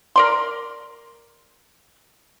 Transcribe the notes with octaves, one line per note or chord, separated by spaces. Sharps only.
A#4 D5 C6